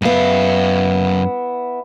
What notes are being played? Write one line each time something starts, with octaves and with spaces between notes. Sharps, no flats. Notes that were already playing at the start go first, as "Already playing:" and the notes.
F#2 B3 E4 F5